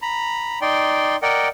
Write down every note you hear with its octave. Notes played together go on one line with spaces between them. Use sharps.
A#5 B5
D#4 D5 G5 C6
A#4 D5 D#5 F#5 G5